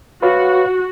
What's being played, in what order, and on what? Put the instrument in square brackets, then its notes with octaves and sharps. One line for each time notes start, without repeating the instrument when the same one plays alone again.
[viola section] F#4 [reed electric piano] B4 C#5 F5